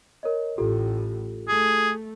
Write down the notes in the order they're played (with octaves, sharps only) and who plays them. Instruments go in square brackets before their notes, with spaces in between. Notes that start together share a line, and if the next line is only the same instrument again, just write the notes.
[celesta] A#4 C#5 D#5
[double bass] A1 A2 [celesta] F4 G4 A4
[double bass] A3 [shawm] G#4